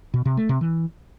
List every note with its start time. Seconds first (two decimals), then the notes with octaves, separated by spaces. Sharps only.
0.14 B2
0.25 C3
0.37 A3
0.49 C3
0.61 E3